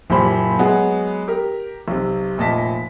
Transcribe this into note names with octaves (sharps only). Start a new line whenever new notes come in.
F#1 A#2 G4 C5 B5 C6
F#3 G#3 B3 F#4 G#4
G4 A#4
B1 C3
F1 A#2 D#5 A5 B6